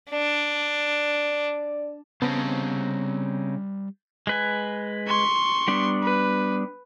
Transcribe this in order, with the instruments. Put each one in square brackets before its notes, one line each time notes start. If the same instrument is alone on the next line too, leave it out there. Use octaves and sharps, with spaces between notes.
[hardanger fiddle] D4 [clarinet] D5
[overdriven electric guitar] C#3 [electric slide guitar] G3 C5 A5 [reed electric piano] B3 [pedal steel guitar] C4 D#4
[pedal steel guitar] G#3 B4 G#5
[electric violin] C6 C#6
[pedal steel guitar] G3 B3 D4
[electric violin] B4